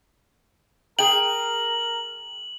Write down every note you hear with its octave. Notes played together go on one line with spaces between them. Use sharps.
G#4 A#4 G5 F#7